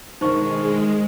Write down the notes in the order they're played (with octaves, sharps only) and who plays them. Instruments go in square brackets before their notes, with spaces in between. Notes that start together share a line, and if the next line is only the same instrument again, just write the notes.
[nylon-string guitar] B2 D3 D#3 [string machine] G#3 [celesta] D#4 C5 C#6